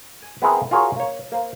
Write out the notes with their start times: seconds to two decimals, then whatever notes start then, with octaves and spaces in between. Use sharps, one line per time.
0.22 G#5
0.42 B3 C4 E4 G#4 A#4 F#5
0.71 F4 F#4 G#4 A#4 C#5 F5
0.96 A#3 C#5
1.32 A#3 C5